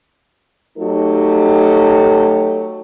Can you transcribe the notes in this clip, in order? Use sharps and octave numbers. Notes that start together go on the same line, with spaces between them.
F#3 A3 D#4 G4 A4